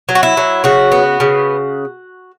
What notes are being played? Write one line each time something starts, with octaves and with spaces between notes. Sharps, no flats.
F#3
F#4
E4
F#3
C#3 F#4
B3
C#3